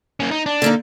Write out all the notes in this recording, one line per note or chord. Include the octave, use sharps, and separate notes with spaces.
A#3 C#4
D#4
D4
D3 A#3 D#4